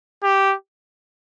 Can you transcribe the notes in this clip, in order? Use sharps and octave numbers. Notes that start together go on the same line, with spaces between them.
G4